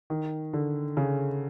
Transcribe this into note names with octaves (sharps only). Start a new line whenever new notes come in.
D#3
D3
C#3